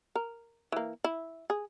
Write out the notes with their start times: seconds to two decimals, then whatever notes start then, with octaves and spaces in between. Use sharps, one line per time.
0.16 A#4
0.72 E3 A#3
1.04 E4
1.50 G#4